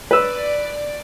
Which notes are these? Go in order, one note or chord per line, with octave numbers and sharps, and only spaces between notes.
B4 D5 E6